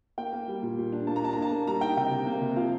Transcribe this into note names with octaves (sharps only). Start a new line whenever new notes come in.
A#3 G5
A#3
G3
A#2
A#2
D4
A#3 A5
A#5
D4 A5
A#5
A#3
A5
A#3
G3 A#5
D#4 G5
C3 G5
C3
A#3
C3
F3 F5